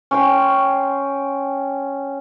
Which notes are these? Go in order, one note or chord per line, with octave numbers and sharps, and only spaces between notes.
C#4 G5 C6